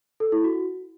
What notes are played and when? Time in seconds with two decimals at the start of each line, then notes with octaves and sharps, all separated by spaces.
0.20 A4
0.32 E4
0.44 F#4